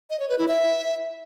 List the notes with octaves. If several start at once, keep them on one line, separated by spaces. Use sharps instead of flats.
D#5
C#5
B4
E4
E5